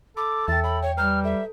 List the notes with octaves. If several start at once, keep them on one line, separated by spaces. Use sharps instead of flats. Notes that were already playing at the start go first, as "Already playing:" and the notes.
A4 B5 D6
E2 E5 G5 A6
C#5 B5
C#5 G5
G3 B4 A#5 F6 G6
A4 E5